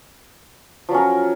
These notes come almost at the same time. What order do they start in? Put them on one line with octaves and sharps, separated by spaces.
F3 F#3 C#4 A#4